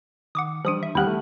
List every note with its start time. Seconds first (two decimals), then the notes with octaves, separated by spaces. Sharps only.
0.35 D#3 F#5 D6 D#6
0.65 E3 F3 G3 D4 D#6 D#7
0.83 E5
0.95 D#2 G3 B3 E4 G4 G5 F#6
1.07 A3